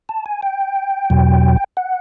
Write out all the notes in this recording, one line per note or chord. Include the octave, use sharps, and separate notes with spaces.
A5
G#5
G5
E2 B2 F#3
F#5